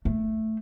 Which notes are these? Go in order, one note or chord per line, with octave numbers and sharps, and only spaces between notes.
A3